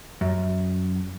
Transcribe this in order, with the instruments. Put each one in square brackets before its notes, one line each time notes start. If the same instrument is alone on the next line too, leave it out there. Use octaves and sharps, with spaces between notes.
[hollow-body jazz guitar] F#2